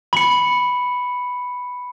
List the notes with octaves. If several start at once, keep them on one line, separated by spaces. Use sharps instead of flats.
B5 C#7